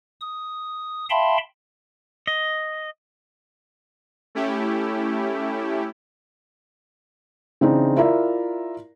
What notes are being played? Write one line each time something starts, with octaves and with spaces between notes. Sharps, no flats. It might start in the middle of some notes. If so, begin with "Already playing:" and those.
D#6
E5 F5 G5 A5 B5 C6
D#5
A3 C#4 E4 G4
C#3 E3 C4 D4 D#4
E4 F4 A#4 D5 E5 A#5